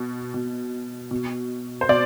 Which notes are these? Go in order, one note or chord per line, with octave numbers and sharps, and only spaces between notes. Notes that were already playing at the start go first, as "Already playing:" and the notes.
Already playing: B2
B2
B2
C5
B2 D5